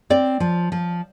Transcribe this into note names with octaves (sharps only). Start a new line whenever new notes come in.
C4 D5
F3
F3